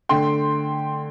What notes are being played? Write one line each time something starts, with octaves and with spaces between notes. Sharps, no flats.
D3 A3 G5 C6